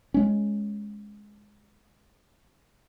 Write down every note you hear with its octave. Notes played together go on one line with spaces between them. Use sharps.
G#3 C#4